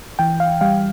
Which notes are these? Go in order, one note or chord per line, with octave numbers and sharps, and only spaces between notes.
E3 G5
F5
G3 F5